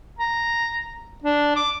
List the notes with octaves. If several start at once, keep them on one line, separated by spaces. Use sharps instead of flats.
A#5
D4
D6